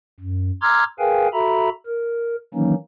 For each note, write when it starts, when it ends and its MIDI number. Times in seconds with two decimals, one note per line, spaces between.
0.20 0.51 42
0.62 0.84 82
0.62 0.84 84
0.62 0.84 86
0.62 0.84 88
0.62 0.84 89
0.62 0.84 92
0.99 1.28 68
0.99 1.28 70
0.99 1.28 71
0.99 1.28 77
0.99 1.28 79
0.99 1.28 80
1.33 1.69 66
1.33 1.69 69
1.33 1.69 76
1.33 1.69 82
1.33 1.69 83
1.86 2.35 70
2.54 2.74 51
2.54 2.74 52
2.54 2.74 54
2.54 2.74 58
2.54 2.74 61
2.54 2.74 63